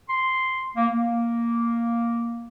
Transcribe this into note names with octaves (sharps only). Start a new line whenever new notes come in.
C6
A#3
A#3